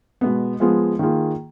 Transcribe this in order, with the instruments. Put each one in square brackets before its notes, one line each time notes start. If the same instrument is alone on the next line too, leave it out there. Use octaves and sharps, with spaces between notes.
[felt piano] B2 G#3 B3
F3 G#3 B3 F4 G#4
D#3 A#3 F4 G#4